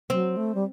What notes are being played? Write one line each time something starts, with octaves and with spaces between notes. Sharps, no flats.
F#3 C4
A3
G3